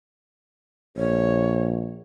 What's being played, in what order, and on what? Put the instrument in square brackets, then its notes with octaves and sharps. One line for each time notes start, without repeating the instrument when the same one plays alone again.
[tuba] A#1 [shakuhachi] C#5